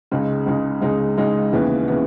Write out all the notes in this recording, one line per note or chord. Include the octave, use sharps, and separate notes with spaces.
C#2 C#3 G#3 D#4
C#2 C#3 G#3 D#4
C#2 C#3 G#3 D#4
C#2 C#3 G#3 D#4
D#2 C#3 E3 B3
C#3 E3 B3